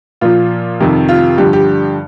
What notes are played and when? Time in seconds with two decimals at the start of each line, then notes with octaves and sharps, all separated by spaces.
0.21 A#2 F3 F4
0.80 F2 C3 D#3
1.08 F4
1.38 G2 D3 F3 G4
1.53 G4